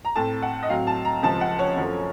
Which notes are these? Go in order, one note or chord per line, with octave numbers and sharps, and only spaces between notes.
A#5
A2 A3 C4 A5
F#5
D#5
A2 F#3 C4 F5
A5
A#5
C#2 C3 F3 A5
F#5
C#5
F#2 F3 A3